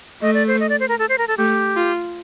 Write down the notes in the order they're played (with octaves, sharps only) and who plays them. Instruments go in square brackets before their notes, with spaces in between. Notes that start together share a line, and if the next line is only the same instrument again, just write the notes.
[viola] A3 [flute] D#5
[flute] D5
C5
D#5
D5
C5
A#4
A4
C5
A#4
A4
[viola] A3 [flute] G4
[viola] F4